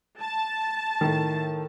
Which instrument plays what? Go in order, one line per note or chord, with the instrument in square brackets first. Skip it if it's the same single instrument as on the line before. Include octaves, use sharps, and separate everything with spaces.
[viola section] A5
[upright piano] A2 D#3